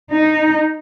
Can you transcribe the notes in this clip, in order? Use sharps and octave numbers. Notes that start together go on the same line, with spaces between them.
D#4